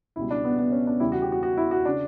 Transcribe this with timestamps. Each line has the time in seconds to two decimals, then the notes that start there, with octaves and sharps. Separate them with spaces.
0.16 C#2 B2 G3 E4
0.31 D4
0.44 B3
0.59 B3
0.72 C#4
0.87 D4
1.00 E2 C#3 G3 E4
1.12 F#4
1.22 G4
1.32 F#4
1.43 F#4
1.57 E4
1.71 F#4
1.85 C#3 D4